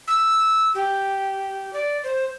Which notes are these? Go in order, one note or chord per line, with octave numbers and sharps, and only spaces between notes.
E6
G4
D5
C5